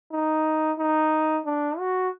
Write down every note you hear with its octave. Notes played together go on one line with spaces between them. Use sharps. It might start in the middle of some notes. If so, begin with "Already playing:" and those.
D#4
D#4
D4
F#4